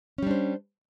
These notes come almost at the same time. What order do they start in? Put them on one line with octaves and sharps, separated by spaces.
C#4 G3 D4 C5